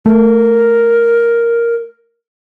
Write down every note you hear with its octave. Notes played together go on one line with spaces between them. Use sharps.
A3 A#4